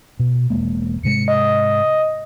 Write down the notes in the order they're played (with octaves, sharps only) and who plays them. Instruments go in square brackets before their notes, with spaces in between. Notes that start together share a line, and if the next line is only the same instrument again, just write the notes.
[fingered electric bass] B2
E1 G#3 A#3
[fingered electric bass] G#2 C3 G#3 [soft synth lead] C#7
[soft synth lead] D#5